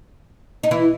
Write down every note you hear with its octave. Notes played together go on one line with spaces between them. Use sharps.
D#4
E3 E4